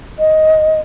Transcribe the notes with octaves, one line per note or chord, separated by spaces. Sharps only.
D#5